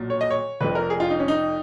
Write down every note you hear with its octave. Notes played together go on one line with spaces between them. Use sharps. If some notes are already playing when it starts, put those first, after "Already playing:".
Already playing: B1 A#2 F#3
C#5
D#5
C#5
F1 F2 F3 B4
A#4
G#4
F4
D#4
C#4
D#4